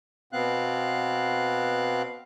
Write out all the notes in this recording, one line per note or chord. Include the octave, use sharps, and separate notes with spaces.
B2 B3 C4 F5 F#6